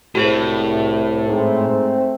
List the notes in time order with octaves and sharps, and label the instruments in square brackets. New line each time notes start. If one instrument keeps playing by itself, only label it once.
[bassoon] C2 [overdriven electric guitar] A2 [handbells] F#4 G#4 C5
[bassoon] G#2 [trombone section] A3 C4